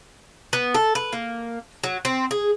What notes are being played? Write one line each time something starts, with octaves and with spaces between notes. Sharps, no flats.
B3
A4
B4
A#3
F#3
C4
G#4